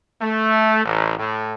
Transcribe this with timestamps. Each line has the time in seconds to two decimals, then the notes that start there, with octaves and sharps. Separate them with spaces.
0.21 A3
0.84 A1
1.18 A2